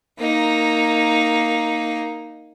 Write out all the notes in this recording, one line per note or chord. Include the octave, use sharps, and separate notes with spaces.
A#3 D#4